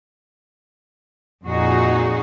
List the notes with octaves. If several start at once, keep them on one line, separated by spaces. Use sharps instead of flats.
F2 A#2 D#4 F#4 G#4 D#5